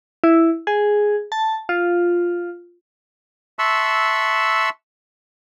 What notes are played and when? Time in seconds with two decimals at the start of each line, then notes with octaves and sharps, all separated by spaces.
0.24 E4
0.67 G#4
1.32 A5
1.69 F4
3.59 E5 A5 C6 C#6 E6 F#6